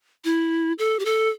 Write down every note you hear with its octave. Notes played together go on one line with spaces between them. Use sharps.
E4
A4
G4
A4